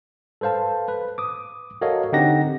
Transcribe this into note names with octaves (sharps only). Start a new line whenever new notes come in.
A4 B4 C5 F5 A5
B4
D6 D#6
F#4 A4 A#4 C#5 D#5 F5
D3 C4 D#4 G4 F#5 A#6